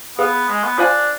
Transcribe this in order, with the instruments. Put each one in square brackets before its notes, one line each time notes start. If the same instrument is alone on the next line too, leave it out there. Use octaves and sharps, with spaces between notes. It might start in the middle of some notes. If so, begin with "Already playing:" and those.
[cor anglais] B3 [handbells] G#4 B4 F5
[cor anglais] G#3
B3
[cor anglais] D4 [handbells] F4 C5 F5 G#5